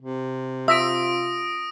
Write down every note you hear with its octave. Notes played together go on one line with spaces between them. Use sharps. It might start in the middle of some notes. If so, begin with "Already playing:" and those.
C3
F4 E5 D#6 A#6 D7